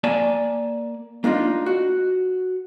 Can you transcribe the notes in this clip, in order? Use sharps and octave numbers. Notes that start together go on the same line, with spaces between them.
A#3 D5 G#5 A5
A#3 D4 D#4 F4
F#4